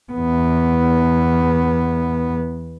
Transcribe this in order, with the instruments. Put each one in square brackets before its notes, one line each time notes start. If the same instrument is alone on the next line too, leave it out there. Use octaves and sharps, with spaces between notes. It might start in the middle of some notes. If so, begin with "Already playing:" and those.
[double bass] E2 B3